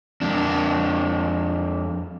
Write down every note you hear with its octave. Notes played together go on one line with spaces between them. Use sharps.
F2 D4